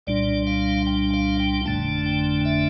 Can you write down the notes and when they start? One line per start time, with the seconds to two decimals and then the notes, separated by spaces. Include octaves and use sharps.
0.07 C2 A#2 G3 D4 D5
0.47 F5
0.87 G5
1.14 F5
1.40 G5
1.65 G1 F2 D3 A3 D4 A5
2.06 G5
2.45 E5